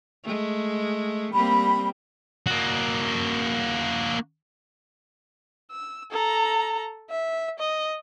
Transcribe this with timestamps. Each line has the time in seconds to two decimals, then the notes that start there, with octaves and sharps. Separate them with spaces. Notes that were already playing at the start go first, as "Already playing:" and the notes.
0.24 G#3 A3
1.32 G3 A#3 C4 B5
2.46 A#3 F#4
5.71 E6
6.11 A4 A#5
7.10 E5
7.59 D#5